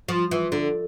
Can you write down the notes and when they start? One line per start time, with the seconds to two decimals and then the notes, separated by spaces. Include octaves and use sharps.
0.08 F3
0.31 E3
0.52 D3